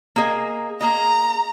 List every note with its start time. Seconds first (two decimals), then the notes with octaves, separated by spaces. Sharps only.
0.16 A#3 G#4 D#5
0.81 A#3 G#4 D#5 A#5